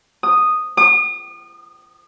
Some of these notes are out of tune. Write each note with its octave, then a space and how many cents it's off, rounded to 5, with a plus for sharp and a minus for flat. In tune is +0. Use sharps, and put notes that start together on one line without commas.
D#6 -5
D#6 -40